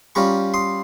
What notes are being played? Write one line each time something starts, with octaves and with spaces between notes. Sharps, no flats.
G3 C#4 F4 A#5 C#6
C6 D#6